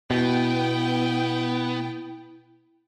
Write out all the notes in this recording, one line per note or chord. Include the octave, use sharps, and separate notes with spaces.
B2 B3 E4 G5